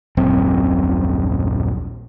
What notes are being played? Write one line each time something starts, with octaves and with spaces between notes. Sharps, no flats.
D#1 A#1 F#2 C4